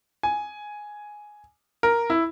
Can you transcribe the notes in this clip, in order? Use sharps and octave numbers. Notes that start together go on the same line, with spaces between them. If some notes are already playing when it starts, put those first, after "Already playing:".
G#5
A#4
E4